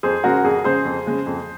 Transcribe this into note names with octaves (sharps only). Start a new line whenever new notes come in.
F2 G#4 C5
C#3 G#3 F#4 A#4
F2 G#4
C#3 G#3 G#4 C5
F2
C#3 G#3
F2